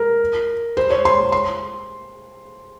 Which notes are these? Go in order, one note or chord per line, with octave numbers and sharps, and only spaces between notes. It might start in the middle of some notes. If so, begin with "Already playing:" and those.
Already playing: A#4
C5
C#5
C6
C6